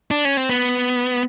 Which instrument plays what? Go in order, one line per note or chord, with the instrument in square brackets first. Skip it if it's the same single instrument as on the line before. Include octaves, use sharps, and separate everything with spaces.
[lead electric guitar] D4
C#4
C4
B3